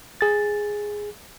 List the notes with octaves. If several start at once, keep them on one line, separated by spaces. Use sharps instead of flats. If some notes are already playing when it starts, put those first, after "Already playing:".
G#4 A6